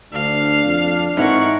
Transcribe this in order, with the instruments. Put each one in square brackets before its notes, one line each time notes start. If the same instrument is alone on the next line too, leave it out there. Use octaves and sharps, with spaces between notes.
[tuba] D2 [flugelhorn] D4 [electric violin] F5
[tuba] F2
[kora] G#2 E3 A#4 [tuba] C4 [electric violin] F#5 C#6